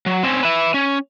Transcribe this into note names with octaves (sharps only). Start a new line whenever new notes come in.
F#3
C4 C#4
B4 E5
C#4